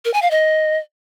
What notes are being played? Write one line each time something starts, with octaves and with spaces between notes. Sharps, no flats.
A#4
G#5
F5
D#5